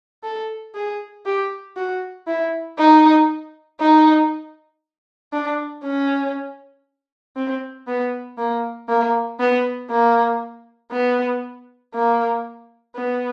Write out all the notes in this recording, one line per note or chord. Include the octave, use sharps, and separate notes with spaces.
A4
G#4
G4
F#4
E4
D#4
D#4
D4
C#4
C4
B3
A#3
A#3
B3
A#3
B3
A#3
B3